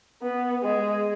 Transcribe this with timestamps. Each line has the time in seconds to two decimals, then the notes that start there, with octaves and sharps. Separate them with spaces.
0.22 B3
0.63 G#3